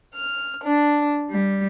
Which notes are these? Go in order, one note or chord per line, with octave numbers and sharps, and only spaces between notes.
F6
D4
G3